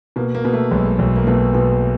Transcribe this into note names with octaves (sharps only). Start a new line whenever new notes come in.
B2 A#3
A#3
B2
A3
B1 G#3
B1
A#3
B2 A3
B2